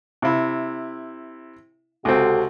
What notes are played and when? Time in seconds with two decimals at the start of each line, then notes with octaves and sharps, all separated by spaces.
0.22 C3 E4
2.05 C#2 C3 C4 F#4 A4